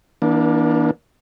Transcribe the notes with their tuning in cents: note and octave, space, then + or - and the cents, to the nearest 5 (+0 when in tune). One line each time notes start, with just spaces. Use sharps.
E3 -30 A#3 +35 D4 +0